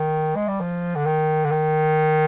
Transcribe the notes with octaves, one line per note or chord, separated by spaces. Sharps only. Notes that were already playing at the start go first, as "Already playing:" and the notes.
Already playing: D#3
G#3
G3
F3
D3
D#3
D3
D#3